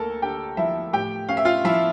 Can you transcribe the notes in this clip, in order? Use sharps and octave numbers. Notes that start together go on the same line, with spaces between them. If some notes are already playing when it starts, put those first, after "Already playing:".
Already playing: D2 A#3 A4 A#4 A5
D3 G4 G5
F3 E4 E5
A2 G4 G5
C#4 F5
E5
F4 F5
F3 E4 E5